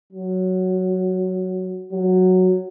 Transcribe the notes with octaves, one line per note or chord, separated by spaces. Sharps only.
F#3
F#3